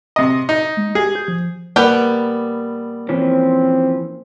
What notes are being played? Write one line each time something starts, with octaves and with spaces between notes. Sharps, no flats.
C3 D#5
D#4
G#3
G4 G#4
G6
F3
G3 A#3 B3 A#4 G5
E3 F3 C4 C#4